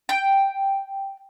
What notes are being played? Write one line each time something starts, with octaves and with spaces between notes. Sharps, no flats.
G5